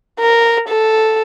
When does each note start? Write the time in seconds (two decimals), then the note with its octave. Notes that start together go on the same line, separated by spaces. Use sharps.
0.20 A#4
0.69 A4